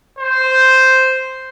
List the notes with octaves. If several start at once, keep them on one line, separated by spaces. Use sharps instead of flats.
C5